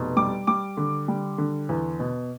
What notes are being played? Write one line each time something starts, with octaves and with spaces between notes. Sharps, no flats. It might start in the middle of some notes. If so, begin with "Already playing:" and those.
Already playing: F1 B2
G3 D6
G3 D6
D3
G3
D3
E2
B2